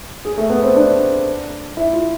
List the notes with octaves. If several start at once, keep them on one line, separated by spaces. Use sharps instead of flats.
G#4
A3
B3
C4
D4
E4
F4